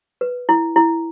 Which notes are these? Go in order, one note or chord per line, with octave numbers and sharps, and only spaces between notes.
B4
E4
E4